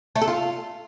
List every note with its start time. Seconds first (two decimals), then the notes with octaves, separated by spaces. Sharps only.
0.15 A3
0.21 A4
0.27 F4